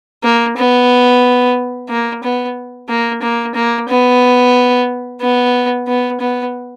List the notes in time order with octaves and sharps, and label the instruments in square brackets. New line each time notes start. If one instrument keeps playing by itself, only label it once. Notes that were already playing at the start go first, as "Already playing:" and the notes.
[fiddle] A#3
B3
A#3
B3
A#3
A#3
A#3
B3
B3
B3
B3